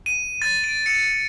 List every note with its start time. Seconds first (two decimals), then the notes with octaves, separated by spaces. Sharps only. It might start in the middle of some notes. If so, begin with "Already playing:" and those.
0.06 D#7
0.42 A6
0.64 D7
0.86 C#7